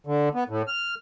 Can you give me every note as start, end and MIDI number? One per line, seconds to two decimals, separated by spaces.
0.07 0.29 50
0.35 0.44 59
0.49 0.62 45
0.68 0.95 89